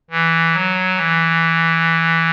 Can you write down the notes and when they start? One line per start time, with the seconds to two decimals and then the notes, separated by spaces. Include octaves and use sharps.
0.11 E3
0.54 F#3
0.96 E3